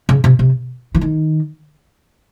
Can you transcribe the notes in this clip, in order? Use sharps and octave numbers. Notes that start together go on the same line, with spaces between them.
C#3
C3
C3
E3
D#3